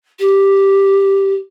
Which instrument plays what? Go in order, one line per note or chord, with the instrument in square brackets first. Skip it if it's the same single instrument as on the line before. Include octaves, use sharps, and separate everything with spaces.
[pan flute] G4